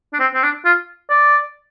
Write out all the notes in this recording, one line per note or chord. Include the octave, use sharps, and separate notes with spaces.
D4
C4
C4
D4
F4
D5